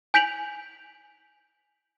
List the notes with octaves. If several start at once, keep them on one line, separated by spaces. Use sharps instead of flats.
G#5 G6 B6 D7 F7 F#7